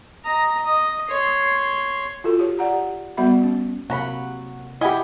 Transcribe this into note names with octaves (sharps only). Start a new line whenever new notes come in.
D#5 A#5
D#5
C#5 C6
F4 F#4 A4
G4 C#5
D5 F#5 A#5
G4
G3 B3 F#4 E5 B5
C#4
C3 F#3 A#3 F#5 A#5 B5
E4 G4 D#5 F#5 G#5 B5